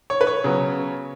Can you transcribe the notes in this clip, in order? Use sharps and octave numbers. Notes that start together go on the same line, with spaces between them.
C#5
B4
C#5
C#3 F#3 B3